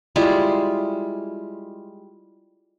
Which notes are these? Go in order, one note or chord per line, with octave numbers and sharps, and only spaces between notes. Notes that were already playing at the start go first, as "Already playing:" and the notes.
G3 G#3 E4 F4